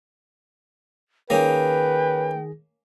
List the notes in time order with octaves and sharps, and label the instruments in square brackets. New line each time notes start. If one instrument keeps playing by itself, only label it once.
[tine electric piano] D#3 G#4 A#6 [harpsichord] A#3 C#4 [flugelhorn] B4 [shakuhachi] G5